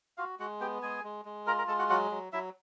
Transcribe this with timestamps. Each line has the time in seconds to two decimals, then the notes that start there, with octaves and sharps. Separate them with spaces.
0.18 F4 F#4 F5
0.39 G#3 F#4 F#5
0.60 B3 G4 G5
0.82 G#3 G#4 G#5
1.04 G#3
1.25 G#3
1.46 F4 A#4 A#5
1.58 A#4 A#5
1.68 G#3 A4 A5
1.79 F#4 F#5
1.89 F#3 F#4 F#5
2.11 F#3
2.32 F#3 E4 E5